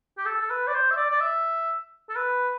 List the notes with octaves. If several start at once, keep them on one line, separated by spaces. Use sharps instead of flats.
G4
A4
A4
B4
D5
C5
E5
D5
D5
E5
A4
B4